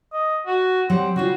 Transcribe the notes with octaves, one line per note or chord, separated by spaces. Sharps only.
D#5
F#4
F#3 G3 C4 F#5
C#3 G3 F4 F#4